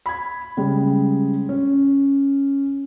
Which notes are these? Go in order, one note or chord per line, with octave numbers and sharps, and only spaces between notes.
B5 G#6
C#3 G3 G#3
C#4